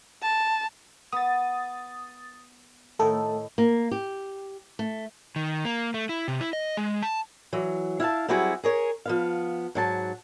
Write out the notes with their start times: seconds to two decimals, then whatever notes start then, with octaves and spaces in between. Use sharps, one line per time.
0.23 A5
1.12 B3 D#6 A6
2.99 A2 D#3 A3 A4
3.58 A#3
3.91 G4
4.79 A3
5.36 D#3
5.65 A#3
5.94 A3
6.09 E4
6.28 C3
6.41 E4
6.53 D#5
6.77 G#3
7.03 A5
7.53 E3 F#3
8.00 E4 F5 F#5 A5
8.28 F#3 G3 C4 E4 F#4 G#4
8.63 G#4 A#4 C#5
9.06 F3 B3 F5
9.75 G#2 F#3 A5